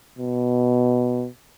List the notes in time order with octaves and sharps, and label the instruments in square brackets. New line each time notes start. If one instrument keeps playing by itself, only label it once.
[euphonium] B2